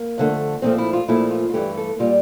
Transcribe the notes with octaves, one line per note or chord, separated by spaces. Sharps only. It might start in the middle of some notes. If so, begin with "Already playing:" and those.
Already playing: A#3
F2 D3 A3
A#2 F3 A3 C4
E4
F4
A#2 F3 A3 E4
F4
F4
G2 E3 A3 G4
A4
A#2 G3 F4